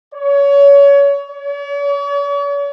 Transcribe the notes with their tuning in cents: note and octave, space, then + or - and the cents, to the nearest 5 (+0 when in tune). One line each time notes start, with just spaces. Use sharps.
C#5 +25
C#5 +45